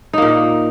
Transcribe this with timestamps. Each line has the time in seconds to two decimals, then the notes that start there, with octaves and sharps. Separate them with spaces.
0.13 D#4
0.18 A#3
0.22 A#2